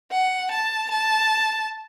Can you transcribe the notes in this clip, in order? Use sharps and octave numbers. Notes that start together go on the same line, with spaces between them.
F#5
A5
A5